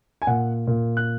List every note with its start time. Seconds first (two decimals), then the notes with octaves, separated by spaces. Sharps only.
0.22 G#5
0.27 A#2 F#5
0.67 A#2
0.97 F#6